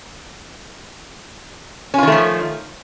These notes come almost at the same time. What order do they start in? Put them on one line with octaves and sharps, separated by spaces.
C#4 F4 D#3 A3 F3